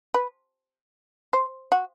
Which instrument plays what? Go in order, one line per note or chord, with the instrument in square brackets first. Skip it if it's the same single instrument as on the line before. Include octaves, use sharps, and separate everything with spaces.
[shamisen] B4
C5
F#4